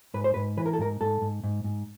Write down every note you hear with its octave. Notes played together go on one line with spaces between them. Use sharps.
G#2 B4
C5
G#2 B4
E3 B4
A#4
A4
G#2 A#4
G#2 A4
G#2
G#2
G#2